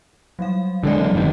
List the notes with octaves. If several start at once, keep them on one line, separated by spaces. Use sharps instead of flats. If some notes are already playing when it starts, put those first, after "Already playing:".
F#3 G3 F5
D3 D#3 G3 G#3 A4 D5
E3 F#3 C4
F1 G2 D#3